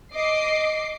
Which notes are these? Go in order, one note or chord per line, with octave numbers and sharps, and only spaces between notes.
D#5 D6 C7